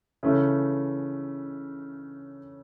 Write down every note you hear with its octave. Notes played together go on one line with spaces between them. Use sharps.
C#3 E3 A3